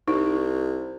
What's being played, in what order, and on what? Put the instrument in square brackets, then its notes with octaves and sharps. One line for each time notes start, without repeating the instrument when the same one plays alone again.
[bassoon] C2 [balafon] D#4